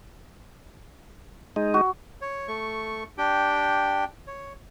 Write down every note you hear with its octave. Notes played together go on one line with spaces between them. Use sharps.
G#3 D#4
F#4
C#5
A3 C#6
D4 G4 G5
C#5